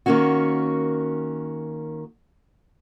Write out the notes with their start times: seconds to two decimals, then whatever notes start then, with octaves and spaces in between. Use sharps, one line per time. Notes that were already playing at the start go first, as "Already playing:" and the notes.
0.06 D#3 A#3 C#4 F#4